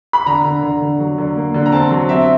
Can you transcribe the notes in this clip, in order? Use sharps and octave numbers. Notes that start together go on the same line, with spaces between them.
B5
D3 A#5
D3
D3
D3
F#3
D3
A#3
D3
A#5
C4 A5
F#3
C4 E5